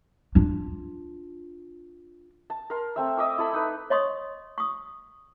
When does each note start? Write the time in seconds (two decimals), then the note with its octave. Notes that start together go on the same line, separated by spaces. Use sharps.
0.35 D4 F4
2.50 A5
2.70 A#4 C6
2.96 A3 C4 E5
3.17 D#5 E5 D6 E6
3.38 E4 A4 B5
3.53 D#4 B4
3.90 C#5 D#5 C6 C#6 D#6
4.58 C#6 D#6